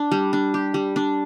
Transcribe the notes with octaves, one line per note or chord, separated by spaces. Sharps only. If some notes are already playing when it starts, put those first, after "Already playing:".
Already playing: D4
G3
D4
G4
G3
D4